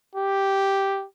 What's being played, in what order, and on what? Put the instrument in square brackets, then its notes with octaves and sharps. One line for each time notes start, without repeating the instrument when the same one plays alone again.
[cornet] G4